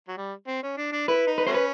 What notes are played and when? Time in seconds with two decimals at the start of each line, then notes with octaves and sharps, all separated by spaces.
0.08 F#3
0.17 G3
0.48 C4
0.63 C#4
0.78 D4
0.92 D4
1.08 E4 B4
1.27 D#4
1.38 B4
1.47 F#3 A3 C#4 C5
1.54 B4